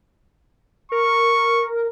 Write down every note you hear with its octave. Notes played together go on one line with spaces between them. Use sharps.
A#4 C#6